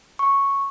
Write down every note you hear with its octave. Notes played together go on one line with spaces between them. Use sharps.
C#6